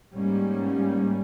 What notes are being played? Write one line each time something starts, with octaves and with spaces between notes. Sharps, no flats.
G#2 G3 A#3 C#4